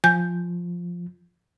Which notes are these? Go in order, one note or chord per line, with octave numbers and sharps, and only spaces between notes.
F3 G#5 G6